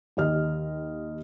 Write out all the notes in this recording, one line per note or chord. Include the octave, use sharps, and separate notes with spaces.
D#2 G4 D#5 F6